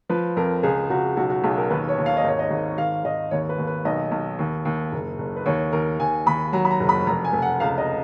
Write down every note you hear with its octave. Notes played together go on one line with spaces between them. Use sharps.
F3 B4
F2 A#4
C#2 G#4
C#2 F#4
B1 F#4
F#4
B1 G#4
A#4
D#2 B4
C#5
D#2
F5
D#5
G#1 C#5
D#5
G#1
G#1 F5
G#1 D#5
D#2 C#5
B4
D#2
B4
B1 D#5
B1
D#2
D#2
F#1
F#1
B4
D#2 C#5
D#2 A#4
D#2 G#5
D#2 B5
F#3 A#5
B5
A#5
F#1
B5
F1 A#5
G#5
F1
F#5
C#2 F5
D#5